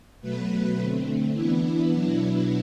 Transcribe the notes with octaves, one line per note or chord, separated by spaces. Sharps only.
B2 F#3 A3 B4
D3 A3 C4
E3 B3 D4 E4
B2 F#3 B3 D4